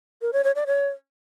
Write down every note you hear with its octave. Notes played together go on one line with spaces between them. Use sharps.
A#4
C#5
C#5
D5
C#5